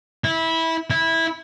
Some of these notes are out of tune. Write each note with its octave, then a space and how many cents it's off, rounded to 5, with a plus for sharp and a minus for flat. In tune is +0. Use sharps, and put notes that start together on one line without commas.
E4 -15
E4 -10